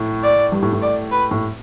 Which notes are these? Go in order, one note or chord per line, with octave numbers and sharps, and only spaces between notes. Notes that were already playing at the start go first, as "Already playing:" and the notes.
Already playing: A2
D5
G2
A2
A2
D5
B4
A2